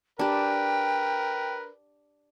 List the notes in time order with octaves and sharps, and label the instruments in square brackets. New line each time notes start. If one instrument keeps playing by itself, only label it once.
[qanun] D4 G4 [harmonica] A#4 B4 [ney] G5